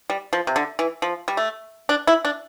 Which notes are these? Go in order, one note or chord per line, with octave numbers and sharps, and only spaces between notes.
G3
F3
C3
D3
E3
F3
G3
A3
D4
E4
D4